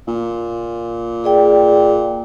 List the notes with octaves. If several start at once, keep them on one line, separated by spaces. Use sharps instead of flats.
A#2
G#4 D5 G5